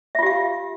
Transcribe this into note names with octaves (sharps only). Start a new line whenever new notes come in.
F4 G4 E5 F5